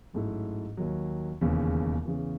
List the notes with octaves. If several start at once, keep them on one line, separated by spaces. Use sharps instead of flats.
A1 G#2 F#3 A3 E4
D#2 D#3 F#3
E1 D#2 C#3 E3
E2 C#3 E3